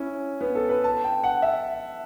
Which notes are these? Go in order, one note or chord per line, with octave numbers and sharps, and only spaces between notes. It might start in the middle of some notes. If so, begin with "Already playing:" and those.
Already playing: C#4 E4
B3
A4
B4
A5
G5
F#5
E5